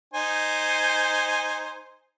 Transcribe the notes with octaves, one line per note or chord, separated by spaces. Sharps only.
D#4 C5 G#5